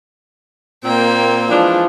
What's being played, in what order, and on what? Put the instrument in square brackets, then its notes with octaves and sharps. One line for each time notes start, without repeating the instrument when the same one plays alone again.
[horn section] A#2 C4 [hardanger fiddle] A#3 G5
[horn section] E3 G#3 D4 [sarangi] F3